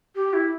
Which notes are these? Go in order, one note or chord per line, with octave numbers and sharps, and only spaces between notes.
G4
E4